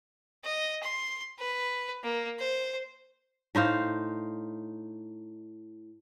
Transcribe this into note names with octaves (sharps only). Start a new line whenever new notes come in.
D#5
C6
B4
A#3
C5
A2 D#4 C5 F5